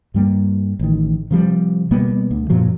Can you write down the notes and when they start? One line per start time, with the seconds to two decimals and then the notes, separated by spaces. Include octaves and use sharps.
0.14 G2 G3 A#3
0.79 A1 D#3
1.31 C3 F3 G3
1.91 B2 G3 A#3 B3
2.31 D2
2.50 F#2 A#2 F3 F#3